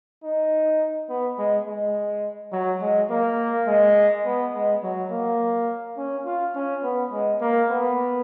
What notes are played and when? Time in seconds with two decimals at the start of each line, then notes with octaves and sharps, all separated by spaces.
0.23 D#4
1.09 B3
1.38 G#3
1.67 G#3
2.52 F#3
2.82 G#3
3.10 A#3
3.67 G#3
4.25 B3
4.54 G#3
4.83 F#3
5.11 A#3
5.97 C#4
6.25 F4
6.55 C#4
6.83 B3
7.12 G#3
7.41 A#3
7.70 B3